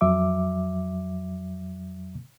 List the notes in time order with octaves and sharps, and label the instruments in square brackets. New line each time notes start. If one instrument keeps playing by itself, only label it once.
[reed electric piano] F2 F#3 E5 D6